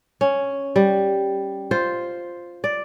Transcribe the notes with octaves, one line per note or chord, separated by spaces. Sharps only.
C#4
G3
F4 C5
D5